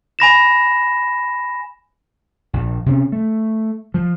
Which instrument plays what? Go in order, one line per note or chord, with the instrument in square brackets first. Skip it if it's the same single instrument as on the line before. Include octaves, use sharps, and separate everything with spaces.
[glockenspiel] G#5 B5 A#6 E7
[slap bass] A#1
C3 C#4
A3
F3